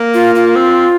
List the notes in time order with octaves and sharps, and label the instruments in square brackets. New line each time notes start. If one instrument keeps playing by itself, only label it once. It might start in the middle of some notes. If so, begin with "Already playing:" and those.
Already playing: [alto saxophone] A#3
[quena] F4
F4
[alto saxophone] C4